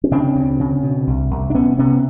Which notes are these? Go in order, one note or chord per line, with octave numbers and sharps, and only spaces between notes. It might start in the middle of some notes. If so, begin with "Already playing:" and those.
C#4
C#3 C4 D4
D2
C#3
B2
C2
C2
D4
C3 B3 C#4
C3 B3 C#4